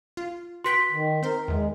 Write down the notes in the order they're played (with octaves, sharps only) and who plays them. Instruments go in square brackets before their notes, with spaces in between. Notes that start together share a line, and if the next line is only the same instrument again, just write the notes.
[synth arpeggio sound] F4
[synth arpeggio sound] F#4 B4 G5 [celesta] C6 B6
[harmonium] D#3
[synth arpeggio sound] C4 C5 [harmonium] A#4
[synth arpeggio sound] E2 D#3 [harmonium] G#3